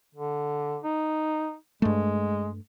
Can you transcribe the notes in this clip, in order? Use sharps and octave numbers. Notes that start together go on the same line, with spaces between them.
D3
D#4
G2 G#3 A3